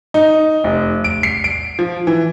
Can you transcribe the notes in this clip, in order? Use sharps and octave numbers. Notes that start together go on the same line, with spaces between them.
D#4
F1
D7
C7
D7
F3
E3